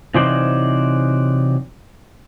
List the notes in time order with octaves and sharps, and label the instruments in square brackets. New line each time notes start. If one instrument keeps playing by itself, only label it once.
[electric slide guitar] C3 E3 F#3 D#4 C5 D5